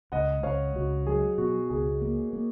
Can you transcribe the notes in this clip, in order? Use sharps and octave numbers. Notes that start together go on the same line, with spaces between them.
C#2 D#5 F#5
C#2 C#5 F5
C#2 F#4
F#3 G#4
B2 F#4
C#2 G#4
A#3
A#3